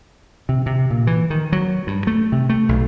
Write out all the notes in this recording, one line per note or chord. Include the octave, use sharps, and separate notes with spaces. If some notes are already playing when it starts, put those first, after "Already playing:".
C3
C3
A#2
E3
D#3
F#3
G2
A3
C3
A3
B1